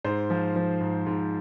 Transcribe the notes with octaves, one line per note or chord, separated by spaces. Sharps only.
G#2 C5
F3
F3
G#2
G#2